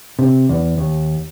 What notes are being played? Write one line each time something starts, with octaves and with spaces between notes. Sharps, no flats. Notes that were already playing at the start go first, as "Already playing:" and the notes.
C3
E2
D#2